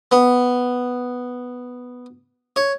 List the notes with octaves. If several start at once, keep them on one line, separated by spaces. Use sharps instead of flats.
B3
C#5